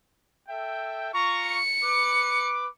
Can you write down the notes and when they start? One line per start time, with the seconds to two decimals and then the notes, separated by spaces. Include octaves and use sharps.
0.49 A4 E5 G5
1.13 F4 A#5 C#6
1.47 C#7
1.83 B4 D6